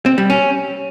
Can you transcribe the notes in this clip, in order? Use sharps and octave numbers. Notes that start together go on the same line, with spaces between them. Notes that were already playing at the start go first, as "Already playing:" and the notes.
C4
G3
C#4